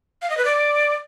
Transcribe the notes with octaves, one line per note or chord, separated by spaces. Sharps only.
F5
D#5
B4
D5